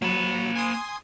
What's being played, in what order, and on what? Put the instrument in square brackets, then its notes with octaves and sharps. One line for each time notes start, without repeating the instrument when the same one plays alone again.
[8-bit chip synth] F#3 [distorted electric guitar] A#3 B5
[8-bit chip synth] G#5 C6 D#6